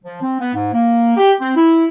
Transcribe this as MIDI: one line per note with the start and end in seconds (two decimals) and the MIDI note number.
0.04 0.20 53
0.21 0.39 60
0.40 0.52 59
0.54 0.71 44
0.73 1.16 58
1.17 1.32 67
1.40 1.52 60
1.56 1.87 64